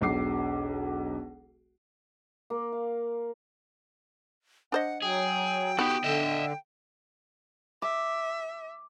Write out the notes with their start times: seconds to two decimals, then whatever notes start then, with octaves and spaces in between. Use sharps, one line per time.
0.01 E1 B1 F#3 D6 C7
2.50 A#3
2.72 F5
4.72 D4 C5 D#5 F#5
5.02 F#3 G#4 G5
5.79 B3 D#4 F#4 G4
6.04 D3 D#5 E5
7.82 E5 D6